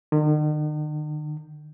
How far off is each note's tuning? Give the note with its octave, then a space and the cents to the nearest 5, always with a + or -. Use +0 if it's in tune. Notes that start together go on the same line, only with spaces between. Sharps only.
D#3 -45